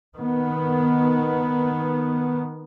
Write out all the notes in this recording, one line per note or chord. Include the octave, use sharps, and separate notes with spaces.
D#3 B3